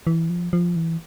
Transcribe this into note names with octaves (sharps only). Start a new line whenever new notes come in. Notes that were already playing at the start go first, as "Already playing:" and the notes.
E3
F3
F3
E3